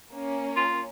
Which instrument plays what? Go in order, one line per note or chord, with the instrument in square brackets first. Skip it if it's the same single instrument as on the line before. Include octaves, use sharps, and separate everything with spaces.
[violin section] A#3 C#4
[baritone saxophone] F4